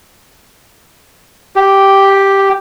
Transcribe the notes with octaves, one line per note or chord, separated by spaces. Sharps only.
G4